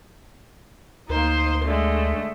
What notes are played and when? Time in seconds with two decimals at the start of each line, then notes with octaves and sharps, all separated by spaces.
1.10 D2 A#3 D#4 C5 C6
1.65 D3 G#3 A3